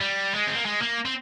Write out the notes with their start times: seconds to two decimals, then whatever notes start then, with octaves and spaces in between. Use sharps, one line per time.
0.01 G3
0.34 G#3
0.47 C4
0.56 A#3
0.65 G#3
0.82 A#3
1.06 C4